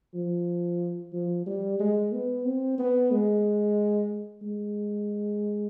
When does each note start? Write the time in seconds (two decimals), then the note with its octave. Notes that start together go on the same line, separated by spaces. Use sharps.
0.14 F3
1.13 F3
1.46 G3
1.79 G#3
2.12 B3
2.45 C4
2.78 B3
3.11 G#3
4.42 G#3